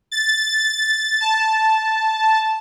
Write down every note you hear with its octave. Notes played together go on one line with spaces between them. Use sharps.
A6
A5